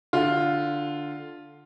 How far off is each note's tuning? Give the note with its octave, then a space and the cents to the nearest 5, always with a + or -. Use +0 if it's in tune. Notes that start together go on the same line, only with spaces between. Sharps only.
D3 +0 F4 +0